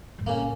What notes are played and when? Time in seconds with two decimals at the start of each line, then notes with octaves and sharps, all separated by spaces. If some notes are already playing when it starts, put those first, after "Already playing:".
0.18 G#2
0.26 A#2 C#3 A#3